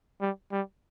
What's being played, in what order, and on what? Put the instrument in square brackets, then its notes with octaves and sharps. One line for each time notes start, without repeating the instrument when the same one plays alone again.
[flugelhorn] G3
G3